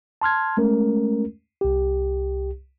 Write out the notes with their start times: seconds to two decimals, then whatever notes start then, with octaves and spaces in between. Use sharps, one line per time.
0.21 A5 C6 F6 G#6
0.57 G#3 A3 C#4 A#4
1.61 C2 G4